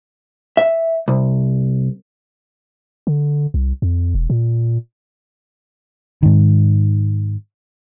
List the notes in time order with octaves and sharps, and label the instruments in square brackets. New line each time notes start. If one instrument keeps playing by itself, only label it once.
[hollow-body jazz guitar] E5
C2
[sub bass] D3
C2
F2
E1
A#2
[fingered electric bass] G#2 D#3